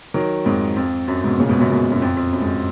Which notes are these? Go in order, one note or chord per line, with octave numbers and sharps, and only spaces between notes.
D#3 F#3
F2 G#2
F2
F#2
G#2 B2
A#2 C#3
G#2 B2
F#2 A#2
G#2 B2
F#2
F2
F2
F#2
G#2